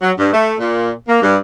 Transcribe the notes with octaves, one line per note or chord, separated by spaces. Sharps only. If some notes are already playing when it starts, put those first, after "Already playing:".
F#3
G2
A3
A#2
A#3
G2